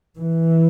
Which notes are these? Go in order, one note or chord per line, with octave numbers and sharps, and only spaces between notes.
E3